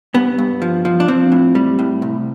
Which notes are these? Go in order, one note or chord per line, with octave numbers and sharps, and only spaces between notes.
G2 B3
G2
F3
F3
D4
F3 C4
A2
G3
A2
C2